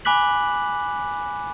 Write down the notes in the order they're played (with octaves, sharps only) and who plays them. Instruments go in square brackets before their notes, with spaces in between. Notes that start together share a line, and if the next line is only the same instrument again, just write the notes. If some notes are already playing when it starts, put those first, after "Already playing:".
[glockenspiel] G#5 B5 D6 F#6 B6 F#7